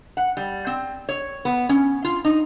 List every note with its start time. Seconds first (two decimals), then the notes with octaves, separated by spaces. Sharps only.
0.17 F#5
0.37 G3
0.67 C4
1.09 C#5
1.45 B3
1.69 C#4
2.04 F4
2.25 D#4